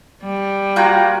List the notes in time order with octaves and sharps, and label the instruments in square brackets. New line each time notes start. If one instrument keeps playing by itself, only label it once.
[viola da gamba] G3
[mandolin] A#3 B4 G5 [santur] F4 F#4 G#5 [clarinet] A#5